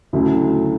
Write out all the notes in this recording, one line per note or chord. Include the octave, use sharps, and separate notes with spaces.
D2 C#3 F#3 A3 E4